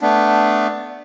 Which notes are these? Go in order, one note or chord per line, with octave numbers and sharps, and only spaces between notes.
A3 B3 D4